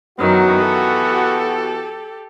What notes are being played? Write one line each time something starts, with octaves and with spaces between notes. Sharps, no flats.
F#2 D#3 E3 F#3 B3 F#4
G4 A4